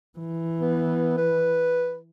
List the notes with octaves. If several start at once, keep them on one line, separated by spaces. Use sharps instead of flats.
E3
B3
B4